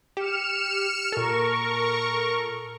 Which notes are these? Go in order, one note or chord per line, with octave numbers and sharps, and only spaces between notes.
G4 F6 C#7 E7
A#2 A4 A#4 C#6